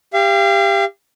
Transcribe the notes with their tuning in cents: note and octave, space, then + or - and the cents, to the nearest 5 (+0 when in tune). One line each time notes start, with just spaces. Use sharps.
G4 +20 F5 -35